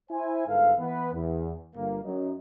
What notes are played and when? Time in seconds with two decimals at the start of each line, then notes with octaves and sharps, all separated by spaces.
0.11 E4 C5 G#5
0.47 G1 G#2 A4 B4 F5
0.79 E3 B3 B4
1.14 E2
1.75 G1 A#3
2.04 F#2 F#3 D#4